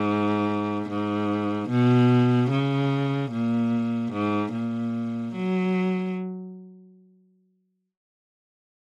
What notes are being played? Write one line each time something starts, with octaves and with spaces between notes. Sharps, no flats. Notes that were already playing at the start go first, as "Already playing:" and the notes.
Already playing: G#2
G#2
B2
C#3
A#2
G#2
A#2
F#3